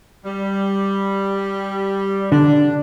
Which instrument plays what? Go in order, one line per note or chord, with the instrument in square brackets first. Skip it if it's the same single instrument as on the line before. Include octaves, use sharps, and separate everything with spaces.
[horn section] G3
[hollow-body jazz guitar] D3 [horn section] D4